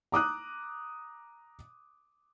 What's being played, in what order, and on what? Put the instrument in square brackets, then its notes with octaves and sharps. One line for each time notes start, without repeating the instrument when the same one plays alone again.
[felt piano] A#5 D6 D#6 F#6